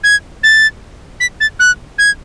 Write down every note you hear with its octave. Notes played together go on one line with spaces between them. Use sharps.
G#6
A6
B6
A6
F#6
G#6